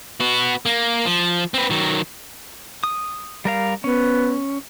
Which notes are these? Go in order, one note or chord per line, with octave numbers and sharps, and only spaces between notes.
B3 F#4
A#3
F3
C4 B4
D#3 F#3
D#6
G3 A#4 F5
B3 C#4